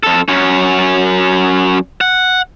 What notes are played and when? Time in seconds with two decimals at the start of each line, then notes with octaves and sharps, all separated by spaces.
0.03 F2 A4
0.28 F#2 C#4
2.01 F#5